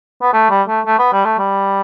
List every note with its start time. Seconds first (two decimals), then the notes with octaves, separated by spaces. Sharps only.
0.22 B3
0.33 A3
0.50 G3
0.68 A3
0.86 A3
0.99 B3
1.13 G3
1.25 A3
1.38 G3